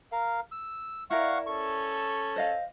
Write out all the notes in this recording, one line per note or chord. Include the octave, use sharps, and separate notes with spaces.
A#4 F5
E6
E4 A#4 D5 F5 F#5 C#6
C#4 A4 C#6
C5 D#5 F5